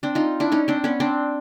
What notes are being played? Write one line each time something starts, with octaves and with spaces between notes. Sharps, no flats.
C4 D4
D#4 F4
D4 E4
C#4 D#4
C4 D4
B3 C#4
C4 D4